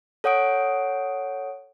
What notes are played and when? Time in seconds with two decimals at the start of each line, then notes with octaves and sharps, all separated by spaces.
0.24 A4 C#5 F#5 D#6 D7